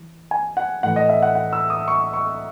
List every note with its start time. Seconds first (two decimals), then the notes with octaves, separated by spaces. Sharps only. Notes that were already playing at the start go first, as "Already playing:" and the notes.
Already playing: E3
0.31 G#5
0.57 F#5
0.83 A2 E3 F#5
0.96 D#5
1.09 E5
1.22 F#5
1.35 F#5
1.53 E6
1.70 D#6
1.88 C#6
2.13 C#6